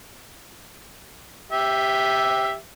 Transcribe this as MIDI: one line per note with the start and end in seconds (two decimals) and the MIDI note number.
1.52 2.54 67
1.52 2.54 76